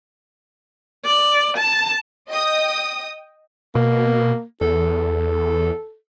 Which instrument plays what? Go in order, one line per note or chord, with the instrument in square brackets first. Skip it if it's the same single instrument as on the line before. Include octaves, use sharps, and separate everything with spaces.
[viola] D5
A5
[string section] D#5 G5 D#6
[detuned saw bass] B2 [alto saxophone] A#3
[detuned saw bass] E2 [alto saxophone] A4